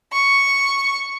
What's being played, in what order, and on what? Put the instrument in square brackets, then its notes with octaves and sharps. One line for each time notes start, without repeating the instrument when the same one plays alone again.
[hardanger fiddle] C#6